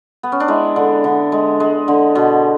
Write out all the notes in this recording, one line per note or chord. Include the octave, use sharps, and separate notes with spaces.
B3
C#4
D4
G#3 E4
D3
D3
G#3
G#3
D3
B2